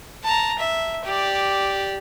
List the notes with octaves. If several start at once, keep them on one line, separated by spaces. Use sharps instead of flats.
A5 A#5
E5
G4 D5